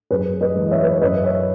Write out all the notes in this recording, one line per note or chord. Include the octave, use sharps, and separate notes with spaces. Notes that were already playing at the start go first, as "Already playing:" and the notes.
F#2 G#4 B4
B4 D#5
E3 G#3
D#5
C#5 E5
B4
C#5
F#2 B4 D#5
C#5 E5